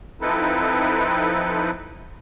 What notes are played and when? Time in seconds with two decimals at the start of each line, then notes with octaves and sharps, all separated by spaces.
0.21 F3 C4 D#4 E4 A4 B4